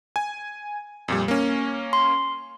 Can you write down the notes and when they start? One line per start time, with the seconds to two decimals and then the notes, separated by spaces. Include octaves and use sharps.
0.16 G#5
1.08 F2 A#2 G3
1.28 A#3 C#4
1.93 C6